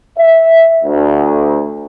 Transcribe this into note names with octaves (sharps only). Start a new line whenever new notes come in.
E5
D2